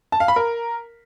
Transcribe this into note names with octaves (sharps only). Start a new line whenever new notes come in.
A5
F5
B5
A#4